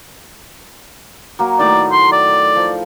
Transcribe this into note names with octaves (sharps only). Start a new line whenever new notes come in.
F#3 A#3
A2 D#3 D5
C6
D5
F3